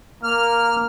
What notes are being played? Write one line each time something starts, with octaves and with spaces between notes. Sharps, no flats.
A#3 F6